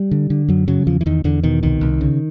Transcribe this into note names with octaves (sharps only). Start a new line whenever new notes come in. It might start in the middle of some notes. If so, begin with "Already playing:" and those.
Already playing: G3
D3
D3
F#2 F#3
C#3 F#3
E2 F3
E3
E2 D#3
E2 D3
B2 D#3
C2 D#3
C2
C#3